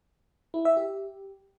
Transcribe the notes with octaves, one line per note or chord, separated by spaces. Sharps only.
E4
E5
G4